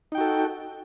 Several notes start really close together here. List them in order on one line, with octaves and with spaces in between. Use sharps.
D#4 G5 F#4 A4